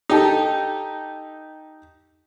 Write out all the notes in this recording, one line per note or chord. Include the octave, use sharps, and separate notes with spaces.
D#4 G4 A4